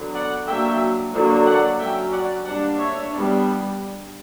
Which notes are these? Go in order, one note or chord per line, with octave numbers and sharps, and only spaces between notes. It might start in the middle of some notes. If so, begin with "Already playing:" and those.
Already playing: D3 F#3 B3
D5 F#5
F#3 A#3 D4 E5 G5
D3 F#3 A#3 D4
D5 F#5
F#3 C#4 E5 G5
D5 F#5
G3 A#3 D4 D5 F#5
C#5 E5
G3 B3 D4